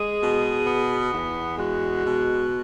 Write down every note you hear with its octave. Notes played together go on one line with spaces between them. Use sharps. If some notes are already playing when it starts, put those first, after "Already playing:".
Already playing: G#3 G#4
B2
B3
E2
G#3 F#4
B2